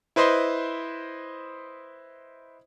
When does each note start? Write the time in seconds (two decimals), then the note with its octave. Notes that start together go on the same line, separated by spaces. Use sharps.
0.16 E4 B4 C5 D#5 C6